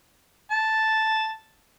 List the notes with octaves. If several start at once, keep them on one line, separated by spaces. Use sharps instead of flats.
A5